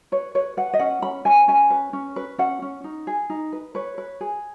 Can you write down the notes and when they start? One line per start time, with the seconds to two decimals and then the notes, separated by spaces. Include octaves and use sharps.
0.12 B4 C#5
0.35 B4 C#5
0.57 B4 F#5
0.74 D#5
0.79 C#4 F#5
1.02 C#4 B5
1.25 C#4 G#5
1.48 C#4 G#5
1.70 B4
1.93 C#4
2.16 B4
2.38 C#4 F#5
2.62 C#4
2.84 D#4
3.07 G#4
3.30 D#4
3.52 B4
3.75 B4 C#5
3.98 B4
4.21 G#4